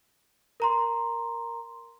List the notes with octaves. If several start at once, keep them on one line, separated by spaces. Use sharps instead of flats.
A#4 A#5 C6